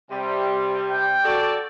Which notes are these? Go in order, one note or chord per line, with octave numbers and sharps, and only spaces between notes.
C3 G3
G5
F#4 A4 D5